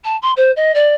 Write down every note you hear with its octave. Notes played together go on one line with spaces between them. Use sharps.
A5
C6
C5
D#5
D5